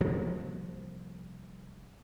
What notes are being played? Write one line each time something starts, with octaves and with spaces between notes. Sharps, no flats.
C2 F3 G3 A#3